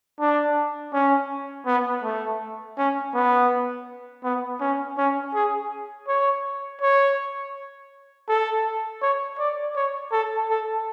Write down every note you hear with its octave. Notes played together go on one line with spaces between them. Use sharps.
D4
C#4
B3
A3
C#4
B3
B3
C#4
C#4
G#4
C#5
C#5
A4
C#5
D5
C#5
A4
A4